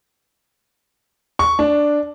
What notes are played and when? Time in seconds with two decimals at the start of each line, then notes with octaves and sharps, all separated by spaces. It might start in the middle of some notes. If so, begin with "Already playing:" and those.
1.39 C#6
1.59 D4